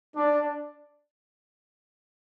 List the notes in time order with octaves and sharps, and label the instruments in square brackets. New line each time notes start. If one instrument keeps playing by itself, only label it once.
[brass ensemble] D4